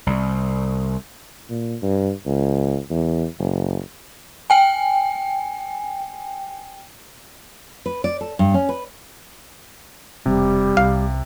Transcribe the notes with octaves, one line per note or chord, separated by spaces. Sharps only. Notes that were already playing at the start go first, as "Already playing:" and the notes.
C2
A#2
G2
C#2
E2
F#1
G5 G#5
B4
D5
A4
G2
C#4
B4
E1 C3 G3
C2 F5